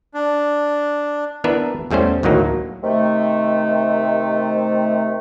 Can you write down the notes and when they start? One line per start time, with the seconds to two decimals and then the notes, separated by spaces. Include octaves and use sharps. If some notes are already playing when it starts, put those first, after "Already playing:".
0.14 D4
1.44 E3 B3 D4 A#4 B4 E5
1.91 E2 G3 A3 C#4 C5
2.23 D2 A2 D#3 F#3 A#3
2.83 C3 D#3 A3